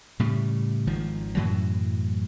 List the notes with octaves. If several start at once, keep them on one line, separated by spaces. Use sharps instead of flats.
A2 C#3 G3
G#1 D#3 F3
F#2 A2 E3 F#3